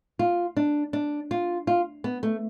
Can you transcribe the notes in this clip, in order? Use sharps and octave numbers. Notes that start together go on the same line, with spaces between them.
F4
D4
D4
F4
F4
B3
A3